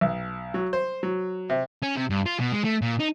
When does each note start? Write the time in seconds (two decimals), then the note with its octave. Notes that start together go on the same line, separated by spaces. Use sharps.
0.01 B1
0.54 F#3
0.73 C5
1.03 F#3
1.50 C3
1.83 C#4
1.97 C3
2.10 G2
2.26 F4
2.40 B2
2.52 G#3
2.64 A3
2.82 A#2
2.99 D#4